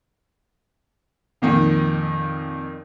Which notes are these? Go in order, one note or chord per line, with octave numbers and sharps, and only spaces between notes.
F2 A#2 D#3